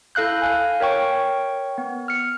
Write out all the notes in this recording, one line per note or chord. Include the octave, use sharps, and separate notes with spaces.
E4 A4 F5 F#6 G6
F5 G#5
A#4 C#5 G5 C#6
B3
F6 C#7